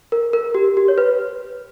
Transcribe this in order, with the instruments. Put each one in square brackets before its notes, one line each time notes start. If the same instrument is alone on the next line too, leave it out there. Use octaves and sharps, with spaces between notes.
[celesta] A#4
A#4
G4
G4
C#5
B4